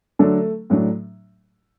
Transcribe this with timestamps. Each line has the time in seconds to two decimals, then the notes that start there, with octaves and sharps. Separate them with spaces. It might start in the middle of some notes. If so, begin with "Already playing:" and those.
0.19 D3 F#3 A3 D4 A4
0.70 A2 F#3 A3 D4